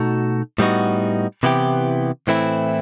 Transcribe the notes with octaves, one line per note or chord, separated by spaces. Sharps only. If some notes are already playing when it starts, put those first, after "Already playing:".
Already playing: B2 A3 D#4 F#4 A4
A2 G3 B3 D#4 F#4
C3 E3 B3 E4 G4
A2 E3 A3 C4 E4